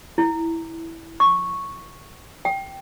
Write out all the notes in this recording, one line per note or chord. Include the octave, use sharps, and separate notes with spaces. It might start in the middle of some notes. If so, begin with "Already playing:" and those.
E4
C#6
G5